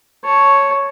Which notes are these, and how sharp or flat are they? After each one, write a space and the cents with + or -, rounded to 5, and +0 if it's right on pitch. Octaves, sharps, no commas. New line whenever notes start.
C#5 +0 A5 +0